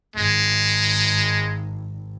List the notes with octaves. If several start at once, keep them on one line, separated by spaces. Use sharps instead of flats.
G#1 G#3